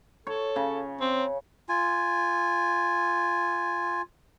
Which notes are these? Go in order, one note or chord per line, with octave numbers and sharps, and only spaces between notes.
A4 C#5
C#3
C4
F4 G#5